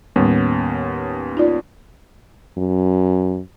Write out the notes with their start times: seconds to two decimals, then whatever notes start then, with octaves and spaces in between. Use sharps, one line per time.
0.16 D#2 A2 G3 B3 C#4
1.37 D#4 F4 D5
2.58 F#2